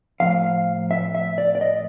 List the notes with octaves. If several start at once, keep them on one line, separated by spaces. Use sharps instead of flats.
A2 F3 A#3 F5
E5
E5
D5
D5
D#5